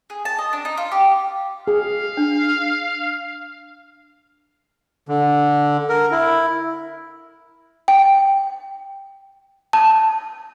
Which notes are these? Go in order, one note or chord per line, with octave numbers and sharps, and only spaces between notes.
G#4
A5
D#5
D4
D#4
F4
G4
G#4 F5
D4
D3
A#4
E4
G5
A5